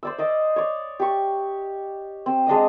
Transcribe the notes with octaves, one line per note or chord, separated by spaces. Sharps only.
C5 D5 E6
D5 D#5 D6
C#5 D5
G4 C#6
C4
G#3 D4 D#5 D#6